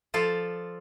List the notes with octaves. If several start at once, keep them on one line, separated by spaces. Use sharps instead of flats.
F3 F4 A4 D5